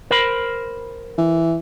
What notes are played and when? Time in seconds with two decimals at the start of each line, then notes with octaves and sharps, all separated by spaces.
0.11 A#4 C5 B5
1.18 E3